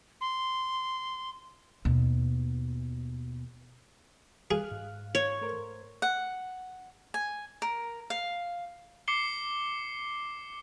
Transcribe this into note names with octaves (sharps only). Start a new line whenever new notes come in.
C6
D#2 B2
G#4 F5 F6 F#6
G#2
C#5
A3 A#4 C5
F#5
G#5
A#4
F5
D6 C7 C#7 G7